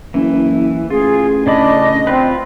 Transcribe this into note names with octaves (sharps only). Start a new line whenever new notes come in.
F#1 E3
A1 F4 G#4
C#3 D4 D5 D#5 B5
C4 F4 B4